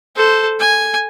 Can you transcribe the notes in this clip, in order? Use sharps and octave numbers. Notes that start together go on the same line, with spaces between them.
A4 C5
G#5